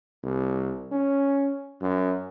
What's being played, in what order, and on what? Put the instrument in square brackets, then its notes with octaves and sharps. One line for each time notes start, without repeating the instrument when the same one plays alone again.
[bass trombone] C2
C#4
F#2